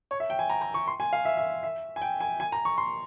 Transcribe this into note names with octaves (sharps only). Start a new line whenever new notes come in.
C#5
E5
G5
G#5
A#5
A#5
C#6
C6
G#5
F5
E5
E5
E5
G#5
G5
G#5
G#5
A#5
C#6
C6